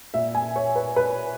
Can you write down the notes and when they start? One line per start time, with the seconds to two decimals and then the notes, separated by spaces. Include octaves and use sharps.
0.14 A#2 E5
0.35 G#5
0.56 C#5
0.75 B4
0.96 B4